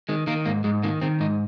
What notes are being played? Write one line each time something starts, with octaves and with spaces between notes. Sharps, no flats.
D#3 G#3
D#3 A#3
G#2 A#3
G#2 G#3
D#3 A#3
D#3 C4
G#2 D#4